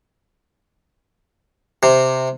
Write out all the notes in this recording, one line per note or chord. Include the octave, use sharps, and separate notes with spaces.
C3